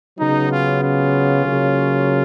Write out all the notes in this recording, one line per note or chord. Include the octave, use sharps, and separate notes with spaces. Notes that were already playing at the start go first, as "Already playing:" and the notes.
C#3 F#3 B3 D#4
C#4 F4
C#4 F4
C#3 F#3 A#3